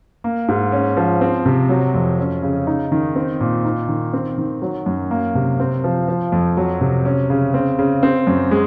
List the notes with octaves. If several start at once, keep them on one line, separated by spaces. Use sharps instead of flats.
A#3
G#2
C#4
F3
C4
C3
F#3
F2
C#4
C#3
D#4
D#3
C4
A#2
D#4
D#3
C4
D#3
F#3
F#2
A#3
C3
C4
F3
F3
F2
F#3
C3
C#4
C#3
C4
C#3
C4
F#2
G#3